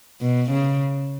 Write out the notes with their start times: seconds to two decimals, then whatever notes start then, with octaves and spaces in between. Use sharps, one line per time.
0.21 B2
0.51 C#3